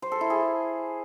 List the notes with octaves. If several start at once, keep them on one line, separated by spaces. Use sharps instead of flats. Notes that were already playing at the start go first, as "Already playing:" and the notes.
C5
A4
E4
G#4